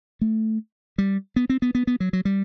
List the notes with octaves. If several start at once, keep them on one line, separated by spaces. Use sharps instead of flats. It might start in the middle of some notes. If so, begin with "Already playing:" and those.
A3
G3
B3
C4
B3
B3
B3
F#3
F#3
G3